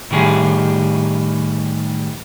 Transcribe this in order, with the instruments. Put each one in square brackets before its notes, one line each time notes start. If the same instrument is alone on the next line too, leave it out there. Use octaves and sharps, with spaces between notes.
[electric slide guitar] A2 D#3 G3 G#4